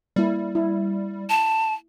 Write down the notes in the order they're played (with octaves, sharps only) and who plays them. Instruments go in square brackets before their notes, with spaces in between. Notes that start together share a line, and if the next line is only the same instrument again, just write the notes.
[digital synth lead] G3 [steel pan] A#3 E4
[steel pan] E4
[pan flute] A5